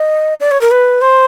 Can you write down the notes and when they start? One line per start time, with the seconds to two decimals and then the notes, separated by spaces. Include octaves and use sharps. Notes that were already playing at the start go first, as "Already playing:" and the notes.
Already playing: D#5
0.40 D5
0.51 C#5
0.61 A#4
0.71 B4
1.01 C5